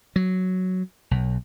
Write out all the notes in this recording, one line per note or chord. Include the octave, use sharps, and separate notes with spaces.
F#3
B1